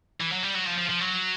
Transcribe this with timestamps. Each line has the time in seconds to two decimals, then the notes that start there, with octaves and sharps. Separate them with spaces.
0.21 E3
0.33 F#3
0.44 G3
0.55 F#3
0.67 F3
0.79 F3
0.90 F3
1.01 F#3